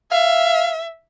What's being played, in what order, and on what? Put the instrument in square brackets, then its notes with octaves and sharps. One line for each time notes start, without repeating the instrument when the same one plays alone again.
[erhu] E5 [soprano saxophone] F5